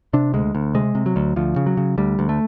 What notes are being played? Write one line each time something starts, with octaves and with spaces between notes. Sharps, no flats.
C3 D4
D2 G#3
D2
C3 G#3
C3
F#3
D2
D2 F3
C#3
F#3
C#3
D2 G3
D2
A3